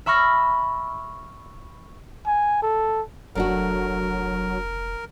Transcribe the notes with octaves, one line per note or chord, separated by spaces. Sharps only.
E5 B5 C#6 F6 A#6
G#5
A4
F1 F#3 A3 D4 F#4 A#4